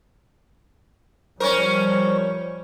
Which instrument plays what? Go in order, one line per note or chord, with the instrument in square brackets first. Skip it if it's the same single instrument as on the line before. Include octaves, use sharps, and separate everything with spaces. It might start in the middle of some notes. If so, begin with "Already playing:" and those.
[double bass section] F3 G3 [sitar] C#4 A#4 [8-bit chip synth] C5 C#6